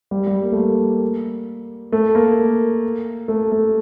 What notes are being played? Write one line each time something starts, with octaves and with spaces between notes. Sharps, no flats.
G3
G3
A#3
A3
A#3
A3
A#3
A3
A3